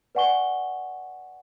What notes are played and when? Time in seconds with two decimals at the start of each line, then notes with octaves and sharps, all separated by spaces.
0.15 B4 D5 F#5 G#5 C#6 G7